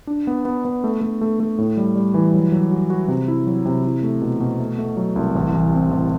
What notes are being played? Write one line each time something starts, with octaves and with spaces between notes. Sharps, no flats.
D4
B3
B3
B3
A3
A3
A3
A3
A2
G3
G3
E3
F#3
F#3
F#4
F#4
C3
E4
F#3
C3
E4
A3
B2
B2
A3
A3
F#3
C2
A1
A1
C4
A1